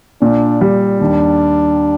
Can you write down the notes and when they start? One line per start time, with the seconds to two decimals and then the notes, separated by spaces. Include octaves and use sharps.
0.22 A#2 D4
0.61 G3
1.00 D#2 D4